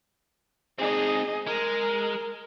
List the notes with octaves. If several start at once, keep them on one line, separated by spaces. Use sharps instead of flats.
C4 D#4 G#4 D#5
G#3 A#4